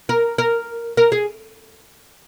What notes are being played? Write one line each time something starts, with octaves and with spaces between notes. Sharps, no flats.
A#4
A#4
A#4
G#4